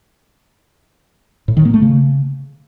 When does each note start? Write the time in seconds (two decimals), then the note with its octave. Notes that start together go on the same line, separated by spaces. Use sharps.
1.48 A2
1.57 D#3
1.65 A#3
1.74 A3
1.82 C#3